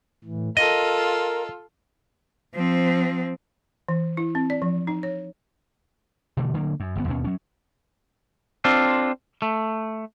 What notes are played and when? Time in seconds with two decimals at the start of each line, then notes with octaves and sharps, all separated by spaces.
0.24 A2 E3
0.57 F4 A4 A#4 D#5
2.55 F3 C4
3.88 E3
4.17 E4
4.35 C4
4.50 D5
4.62 F3
4.87 D#4
5.03 C#5
6.37 B2 D3 E3 A3
6.54 D3 F#3 A3 A#3
6.80 F#2
6.96 G1 C#3 B3
7.07 D#2 B2 C#4
7.24 F#3 C#4
8.64 C4 D4 F4 A4
9.42 A3